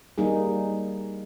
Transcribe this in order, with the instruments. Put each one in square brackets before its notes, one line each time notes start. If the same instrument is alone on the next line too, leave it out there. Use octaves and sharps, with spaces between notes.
[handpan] G3 A#3 D#4 G#4